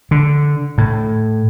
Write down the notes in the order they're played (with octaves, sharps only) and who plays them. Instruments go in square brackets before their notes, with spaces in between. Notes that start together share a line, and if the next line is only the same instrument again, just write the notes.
[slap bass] D3
A2